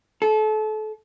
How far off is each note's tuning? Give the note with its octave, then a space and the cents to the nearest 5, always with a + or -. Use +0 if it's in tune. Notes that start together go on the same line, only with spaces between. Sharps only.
A4 -30